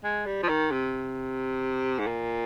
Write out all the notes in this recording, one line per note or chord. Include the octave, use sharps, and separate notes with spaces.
G#3
G3
F3
D#3
C3
G#2
A#2